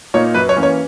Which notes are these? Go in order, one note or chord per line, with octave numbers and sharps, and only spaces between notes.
A#2 A#3 D#4 C#5
F#2 B4
C#5
E3 A#3 C#4
C#5